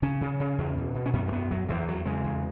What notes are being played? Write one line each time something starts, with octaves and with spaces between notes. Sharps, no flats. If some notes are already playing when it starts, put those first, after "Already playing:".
C#3 C#4
C#3
C#3
E2
B2
B2
C#4
F#2 B3
G#3
F#2 B3
F#2 F#3
E2 E3
E2 F#3
C#3 G#3
E2